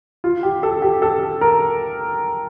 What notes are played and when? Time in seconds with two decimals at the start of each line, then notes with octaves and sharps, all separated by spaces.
0.24 F4
0.43 G4
0.63 A4
0.82 G4
1.02 A4
1.41 A#4